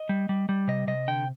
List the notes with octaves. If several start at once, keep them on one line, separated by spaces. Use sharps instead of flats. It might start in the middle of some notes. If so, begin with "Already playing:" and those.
Already playing: D#5
G3
G3
G3
C3 D#5
C3 D#5
D3 G5